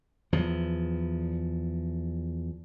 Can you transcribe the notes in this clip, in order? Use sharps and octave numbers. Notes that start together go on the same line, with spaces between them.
E2 F3